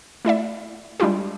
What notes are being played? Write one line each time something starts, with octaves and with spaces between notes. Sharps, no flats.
A3 E4 D5 E5
G3 G#3 D4 E4 F4 G4